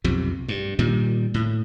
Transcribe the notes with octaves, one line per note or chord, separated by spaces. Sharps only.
B1 F2 C3
G2
A#2 D#3 G3
A2